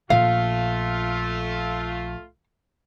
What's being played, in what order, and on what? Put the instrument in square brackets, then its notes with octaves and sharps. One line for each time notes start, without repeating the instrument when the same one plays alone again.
[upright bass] A#1 [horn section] A3 F4 [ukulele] F5